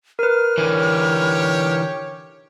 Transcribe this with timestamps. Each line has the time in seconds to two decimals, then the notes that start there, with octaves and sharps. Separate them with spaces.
0.19 A#4 B4 F6
0.58 D3 E3 G4 C#5